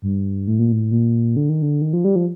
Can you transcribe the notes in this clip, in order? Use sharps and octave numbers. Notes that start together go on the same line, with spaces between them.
G2
A2
A#2
A2
A#2
D3
D#3
D3
D#3
F3
G3
F3